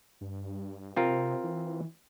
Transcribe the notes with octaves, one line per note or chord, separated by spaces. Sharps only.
G2
C3 C4 F4 A#4
E3